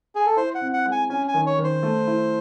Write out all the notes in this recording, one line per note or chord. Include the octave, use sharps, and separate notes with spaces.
G#4
A4
E4 C5
F#5
C4
F#5
G#3
G#5
C#4 G#5
G#5
D#3
C#5
D#3
C5
A3
E4